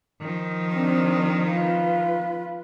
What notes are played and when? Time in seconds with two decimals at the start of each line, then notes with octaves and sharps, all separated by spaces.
0.21 D#3 F3
0.72 C4 D4
1.51 F4 B4